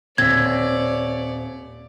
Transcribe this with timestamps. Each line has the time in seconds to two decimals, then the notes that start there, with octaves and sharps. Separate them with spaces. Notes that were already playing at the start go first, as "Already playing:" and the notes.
0.18 D#1 C4 C#5 D5 E6 G#6 B6